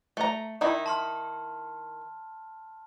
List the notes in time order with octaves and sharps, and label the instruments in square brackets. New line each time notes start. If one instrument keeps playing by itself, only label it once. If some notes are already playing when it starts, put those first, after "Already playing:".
[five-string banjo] A3 A#5
D#3 D#4 E4
[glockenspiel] A5 C6 F6